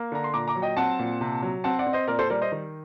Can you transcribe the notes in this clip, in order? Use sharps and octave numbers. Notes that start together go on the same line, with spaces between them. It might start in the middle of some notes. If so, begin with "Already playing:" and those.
Already playing: A#3
D3 A#5
C6
A#2 A#5 D6
A#5 D6
F#3
D#5 G5
C4 F#5 A5
A#2
C3
F#3
C4 F#5 A5
D5 F#5
C4
C5 D#5
A#2 A#4 D5
A4 C5
G3 A#4 D5
C5 D#5
D#3